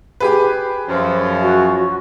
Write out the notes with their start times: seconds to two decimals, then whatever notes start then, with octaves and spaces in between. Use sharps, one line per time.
0.20 G4 G#4 B4
0.89 F#2 F3
1.41 F#4